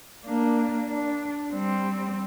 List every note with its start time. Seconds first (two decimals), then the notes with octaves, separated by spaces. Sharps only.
0.25 A#3 D4
0.89 D4
1.52 G3 C4